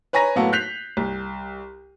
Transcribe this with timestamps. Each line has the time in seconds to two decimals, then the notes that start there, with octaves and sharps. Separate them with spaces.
0.13 B4 C#5 G#5 A#5 A#6
0.36 A2 F#3 A#3 B3 A4
0.53 F#6 G6 B6 C7 F7
0.97 C2